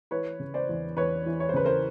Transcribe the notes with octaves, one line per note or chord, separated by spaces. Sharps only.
E3 B4 C#5
C#3
C5 D5
E2
E2 B4 C#5
E3
C#5
C5
C#3 B4
A#4 C5